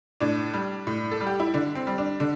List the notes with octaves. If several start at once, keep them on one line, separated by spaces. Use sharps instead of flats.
A2 D4
G3
A2
A4
G3
G4
E4
D3 D4
C4
G3
D4
D3 D4